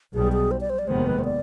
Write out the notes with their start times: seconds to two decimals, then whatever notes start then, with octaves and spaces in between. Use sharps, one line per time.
0.14 B1 B2 G3 G#4
0.33 G#4
0.51 C5
0.61 D5
0.70 C5
0.79 D5
0.88 F1 D#2 D#3 G#3 B3 C5
1.07 B4
1.19 C5
1.25 D5